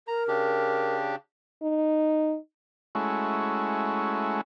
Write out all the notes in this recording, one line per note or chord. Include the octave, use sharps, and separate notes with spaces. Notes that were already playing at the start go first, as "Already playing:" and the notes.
A#4 A#5
C#3 D4 G4
D#4
G#3 A3 C#4 E4 F#4